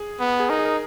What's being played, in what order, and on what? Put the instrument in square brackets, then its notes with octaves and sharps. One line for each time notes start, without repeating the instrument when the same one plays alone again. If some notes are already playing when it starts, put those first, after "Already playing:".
Already playing: [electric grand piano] G#4
[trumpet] B3
[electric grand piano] G#4
[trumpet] D#4 [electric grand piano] A#4
[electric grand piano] G#4
A#4